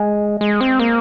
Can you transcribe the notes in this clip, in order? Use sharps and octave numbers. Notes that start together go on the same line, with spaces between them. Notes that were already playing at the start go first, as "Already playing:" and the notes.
Already playing: G#3
G#3
C4
A#3